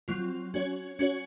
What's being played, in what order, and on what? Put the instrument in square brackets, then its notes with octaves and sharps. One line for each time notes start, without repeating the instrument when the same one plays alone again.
[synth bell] F#3 C4 F4
C#4 F#4 C#5
C#4 F#4 C#5